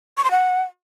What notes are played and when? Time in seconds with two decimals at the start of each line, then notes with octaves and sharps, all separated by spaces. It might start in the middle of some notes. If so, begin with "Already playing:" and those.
0.17 C#6
0.24 C6
0.31 F#5